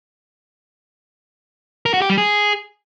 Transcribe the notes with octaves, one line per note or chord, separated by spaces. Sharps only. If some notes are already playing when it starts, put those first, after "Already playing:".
A#4
F#4
G4
G3
G#4